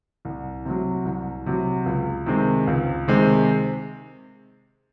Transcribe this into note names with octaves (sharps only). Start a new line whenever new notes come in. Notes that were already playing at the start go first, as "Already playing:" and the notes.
C2
C3 F#3
C2
C3 F#3
C#2
C3 D#3 G#3 C4
C#2
C3 D#3 G#3 C4